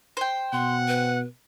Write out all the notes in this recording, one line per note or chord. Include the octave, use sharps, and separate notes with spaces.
C5 G5
B2 F#5 C6
B4